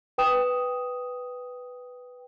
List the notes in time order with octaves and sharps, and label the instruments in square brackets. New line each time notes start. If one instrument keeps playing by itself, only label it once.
[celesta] B4 G5 D#6 E7